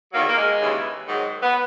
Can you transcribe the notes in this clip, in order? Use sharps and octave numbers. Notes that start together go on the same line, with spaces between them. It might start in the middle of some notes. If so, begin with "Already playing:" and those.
E2 D#3 F#3 A#3
A#3
G#3
D#2 C#3 E3
G#2 D#3 F#3
B3